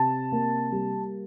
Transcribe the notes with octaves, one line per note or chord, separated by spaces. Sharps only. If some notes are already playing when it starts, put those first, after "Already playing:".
Already playing: C3 A5
A#3
G3